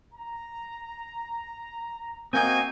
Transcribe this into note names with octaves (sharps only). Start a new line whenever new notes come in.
A#5
A#3 C4 F#4 D#5 G#5 G6